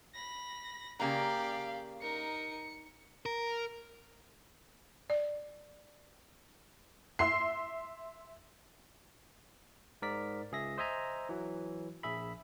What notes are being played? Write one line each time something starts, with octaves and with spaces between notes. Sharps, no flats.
B5 A#6
C#3 A#3 G4 D5 F5 A#5
D#4 A#4 C#7
A#4
D5
E5 C6 C7
G#2 A#4 D5 B6
C#2 G#4 E5 A#6
C5 D#5 E5 G#5 A#5
E3 F#3
A#1 G#4 E5 B5